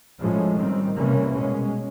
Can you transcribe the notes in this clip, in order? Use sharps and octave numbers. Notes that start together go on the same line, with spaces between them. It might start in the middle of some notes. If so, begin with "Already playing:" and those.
A2 F3 G#3 C#4
D#3 G3 C4
C3 E3 G3 A#3 C#4
B2 G#3 C#4